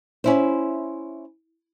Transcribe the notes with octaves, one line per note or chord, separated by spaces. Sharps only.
C#4 E4 C5